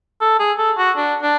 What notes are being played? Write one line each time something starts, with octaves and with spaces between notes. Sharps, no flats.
A4
G#4
A4
F#4
D4
D4